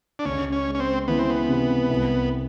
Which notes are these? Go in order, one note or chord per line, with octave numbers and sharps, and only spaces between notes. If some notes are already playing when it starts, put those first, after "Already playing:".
D4
C#2 C#4
C#4
G#3
C#4
C4
E3 B3
C4
B3
C3
C2